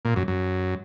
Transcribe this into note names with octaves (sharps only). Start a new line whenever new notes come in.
A#2
F#2
F#2